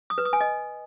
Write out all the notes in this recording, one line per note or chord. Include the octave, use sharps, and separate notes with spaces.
D#6
B4
D#6
G#5
D#5